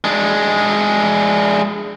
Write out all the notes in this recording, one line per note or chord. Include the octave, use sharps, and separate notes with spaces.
G#3 D4